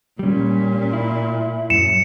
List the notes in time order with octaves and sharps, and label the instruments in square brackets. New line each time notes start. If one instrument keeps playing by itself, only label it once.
[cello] A#2 [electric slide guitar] G3 C#4
[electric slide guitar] E4
[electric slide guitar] F#2 [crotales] C#7 E7